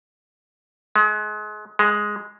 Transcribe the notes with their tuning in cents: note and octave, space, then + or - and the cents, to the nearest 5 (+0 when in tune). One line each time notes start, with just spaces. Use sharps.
G#3 +30
G#3 +0